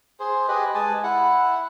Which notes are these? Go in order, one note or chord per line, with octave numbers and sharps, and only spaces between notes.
G#4 C5
G4 G#4 B4 D#5
G#3 G#5 A5
E4 F#5